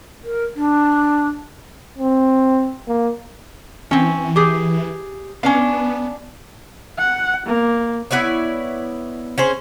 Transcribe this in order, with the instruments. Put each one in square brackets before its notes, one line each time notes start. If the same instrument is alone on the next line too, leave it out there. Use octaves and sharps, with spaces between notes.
[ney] A#4
D4
[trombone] C4
A#3
[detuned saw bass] E3 [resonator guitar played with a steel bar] C4 C#4
[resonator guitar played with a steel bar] G4 G#4
[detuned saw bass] B3 [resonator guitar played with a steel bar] C#4 D4 F5
[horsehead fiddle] F#5
A#3
[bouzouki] B3 E4 C#5 D5
C#4 G#4 C5